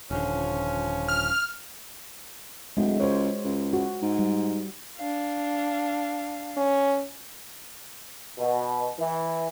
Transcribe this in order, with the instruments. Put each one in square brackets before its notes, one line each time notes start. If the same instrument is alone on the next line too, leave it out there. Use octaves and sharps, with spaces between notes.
[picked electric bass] D#1 D3 [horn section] F3 C#4
[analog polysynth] F6
[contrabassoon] D1 [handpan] G#3 F#4
[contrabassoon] C#2 [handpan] C5 C#5
[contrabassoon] C#2
[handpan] F#4
[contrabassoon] G#2
[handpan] G3
[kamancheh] D4 F5
[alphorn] C#4
[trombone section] B2
E3